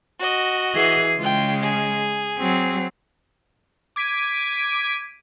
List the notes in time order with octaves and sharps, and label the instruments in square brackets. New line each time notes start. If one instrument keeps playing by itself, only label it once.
[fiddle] F#4 D#5
[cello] E3 G#4
[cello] C#3 G#3 [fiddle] F4 G5
[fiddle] G#4
[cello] F#3 C4
[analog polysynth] D6 G#6 B6 D7 D#7